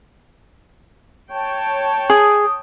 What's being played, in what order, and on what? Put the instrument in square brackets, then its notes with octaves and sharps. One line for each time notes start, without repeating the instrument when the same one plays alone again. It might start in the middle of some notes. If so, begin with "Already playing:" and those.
[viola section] C#5 G5 A5
[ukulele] G#4 [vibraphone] D#6